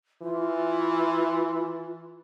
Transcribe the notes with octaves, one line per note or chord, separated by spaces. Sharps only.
E3 F4